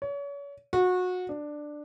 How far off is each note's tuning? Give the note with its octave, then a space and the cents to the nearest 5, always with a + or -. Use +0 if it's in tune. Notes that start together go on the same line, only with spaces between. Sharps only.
C#5 +35
F#4 -25
D4 +10